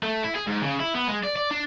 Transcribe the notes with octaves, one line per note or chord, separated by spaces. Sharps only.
A3
E4
G#4
G#2
C#3
E4
B3
G#3
D5
D5
D4